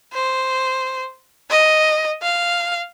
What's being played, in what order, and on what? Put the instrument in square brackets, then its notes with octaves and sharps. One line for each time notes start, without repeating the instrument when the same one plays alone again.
[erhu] C5
D#5
F5